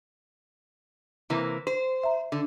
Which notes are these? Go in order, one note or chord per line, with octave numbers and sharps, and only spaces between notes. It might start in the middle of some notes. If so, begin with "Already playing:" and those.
C3 E3 A#3
C5
E5 A#5
D3